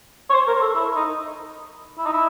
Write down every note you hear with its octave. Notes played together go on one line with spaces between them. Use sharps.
C#5
C5
A#4
A4
E4
D#4
E4
D#4
E4